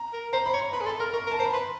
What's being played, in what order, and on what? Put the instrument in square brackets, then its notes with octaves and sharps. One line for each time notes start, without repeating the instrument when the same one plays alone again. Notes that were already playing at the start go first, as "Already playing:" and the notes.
Already playing: [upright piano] A#5
[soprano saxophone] A#4
[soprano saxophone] C5 [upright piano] A#5
[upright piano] B5
[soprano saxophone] C#5
[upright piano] C6
[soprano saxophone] B4 [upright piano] B5
[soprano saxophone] G#4
[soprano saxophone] A4 [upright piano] C6
[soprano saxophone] A#4 [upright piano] F6
[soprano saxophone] A#4 [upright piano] C#6
[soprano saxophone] A#4
[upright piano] A5
[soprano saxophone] C5 [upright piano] A#5
[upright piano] B5
[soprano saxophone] B4 [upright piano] C6